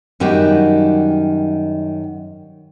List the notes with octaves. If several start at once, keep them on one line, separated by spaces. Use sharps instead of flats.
F#2 D#3 G3 F#4 G4